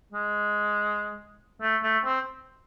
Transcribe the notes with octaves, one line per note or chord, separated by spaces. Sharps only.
G#3
A3
A3
C4